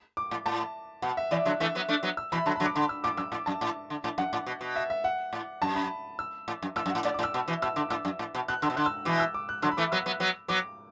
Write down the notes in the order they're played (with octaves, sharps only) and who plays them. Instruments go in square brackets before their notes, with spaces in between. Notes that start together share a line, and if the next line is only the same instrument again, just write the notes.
[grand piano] D6
[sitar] A2
[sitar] A2 [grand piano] A5
[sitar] B2 [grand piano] F#5
[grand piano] E5
[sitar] B2 E3 [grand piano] D5
[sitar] D3 F#3 [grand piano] E5
[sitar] E3 A3 [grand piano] E5
[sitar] F#3 B3
A3 D4
F#3 B3
[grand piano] E6
[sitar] B2 E3 [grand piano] B5
[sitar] D3 F#3 [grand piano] A5
[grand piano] B5
[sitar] D3 F#3
[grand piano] D6
[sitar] D3 [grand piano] B5
[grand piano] E6
[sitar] A2 [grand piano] D6
[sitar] F#2 [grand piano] E6
[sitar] A2 [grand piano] D6
[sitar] F#2 [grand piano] A5
[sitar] A2
D3
A2
[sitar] F#2 [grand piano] F#5
[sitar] A2
B2
B2
[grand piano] E5
E5
F#5
[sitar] A2
[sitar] F#2 [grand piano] A5
[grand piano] B5
E6
[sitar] A2
F#2
[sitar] A2 [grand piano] E6
[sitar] F#2
[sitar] A2 [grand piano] F#5
[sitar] A2 [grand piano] D5
[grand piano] D6
[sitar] A2
[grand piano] E6
[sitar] B2
B2 E3
[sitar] B2 [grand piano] E6
[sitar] D3 [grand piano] D6
[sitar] A2 [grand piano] E6
[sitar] F#2
A2
B2
[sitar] B2 [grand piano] F#6
[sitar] D3 [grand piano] E6
[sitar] B2
[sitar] D3 [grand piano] F#6
[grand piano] E6
[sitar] B2 E3 [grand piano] D6
[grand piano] E6
D6
F#6
[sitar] D3 F#3 [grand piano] E6
[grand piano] B5
[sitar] E3 A3 [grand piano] D6
[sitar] F#3 B3 [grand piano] E6
[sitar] F#3 B3
F#3 B3
[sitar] F#3 B3 [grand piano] D6